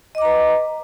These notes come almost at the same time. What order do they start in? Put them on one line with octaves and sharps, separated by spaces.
D#5 D6 A#5 B4